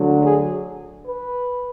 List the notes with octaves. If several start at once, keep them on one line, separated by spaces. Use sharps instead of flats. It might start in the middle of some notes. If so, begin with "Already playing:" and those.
Already playing: D2 D3 F#3
G#4
B4